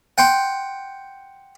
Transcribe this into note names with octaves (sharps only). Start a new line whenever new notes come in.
F#5 G5 C6